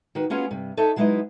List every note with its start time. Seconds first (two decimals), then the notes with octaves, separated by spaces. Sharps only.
0.15 D#3 F#4 B4
0.30 A#3 B3 C#4 F4 F#4 G#4
0.51 G2 C3
0.77 D#4 A4 C#5 E5
0.96 F#3 G#3 D#4 E4 B4 D#5